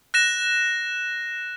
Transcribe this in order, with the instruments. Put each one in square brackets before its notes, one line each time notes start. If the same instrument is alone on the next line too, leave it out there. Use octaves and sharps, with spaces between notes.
[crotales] F#6 A#6 E7